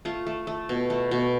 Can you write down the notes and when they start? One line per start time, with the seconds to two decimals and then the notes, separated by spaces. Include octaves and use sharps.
0.05 A3 F4
0.27 A3
0.47 A3
0.69 B2
0.90 A3
1.11 B2